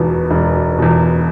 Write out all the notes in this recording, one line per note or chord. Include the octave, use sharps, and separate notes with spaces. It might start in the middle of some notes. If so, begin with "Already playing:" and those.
Already playing: E1 E2 B2
E1
E2 B2